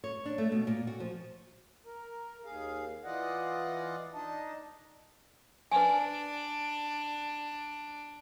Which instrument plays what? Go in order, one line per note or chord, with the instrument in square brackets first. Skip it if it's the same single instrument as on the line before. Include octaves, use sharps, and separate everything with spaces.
[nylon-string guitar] C#5
D4
A3
B2
A#2
F#4
F3
[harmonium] A#4
D#2 G#4 F5
E3 F4 D5 D#5 F#5
D4 D#4 D#5 A5
[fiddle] D4 [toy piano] B4 G#5